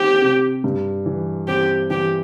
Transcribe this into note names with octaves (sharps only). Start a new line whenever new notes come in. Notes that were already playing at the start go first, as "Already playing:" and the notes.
Already playing: C4 G4
C3
G2
E3
C4 G4
E3 G4